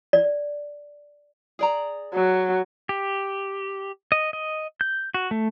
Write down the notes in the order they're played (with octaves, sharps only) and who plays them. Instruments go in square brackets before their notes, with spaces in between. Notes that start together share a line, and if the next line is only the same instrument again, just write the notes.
[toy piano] D5
[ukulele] G#4 D5 A#5
[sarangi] F#3
[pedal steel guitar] G4
D#5
D#5
G6
F#4
A3